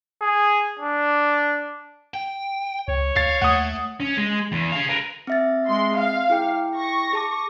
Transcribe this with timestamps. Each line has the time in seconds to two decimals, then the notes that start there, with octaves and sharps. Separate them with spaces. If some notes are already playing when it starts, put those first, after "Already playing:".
0.22 G#4
0.79 D4
2.14 G5
2.88 C#2 C#5
3.16 D2 F5 A6 C7
3.42 D#2 A3 F#5 D#6
4.00 C#4
4.17 G#3
4.52 E2
4.72 G#4 F5
4.89 A#4 B4
5.27 C4 E5 A6
5.67 G#3 C6
5.96 F5
6.30 E4 G#4 G5
6.76 C#6 A#6
7.13 G#4 A5 D6